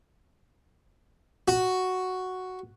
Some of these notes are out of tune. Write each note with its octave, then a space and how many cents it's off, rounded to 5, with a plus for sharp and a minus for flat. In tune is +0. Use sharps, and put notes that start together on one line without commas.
F#4 +0